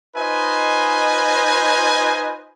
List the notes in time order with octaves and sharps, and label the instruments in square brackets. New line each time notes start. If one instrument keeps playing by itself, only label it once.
[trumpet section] D#4 F4 B4 C5 D#5 G#5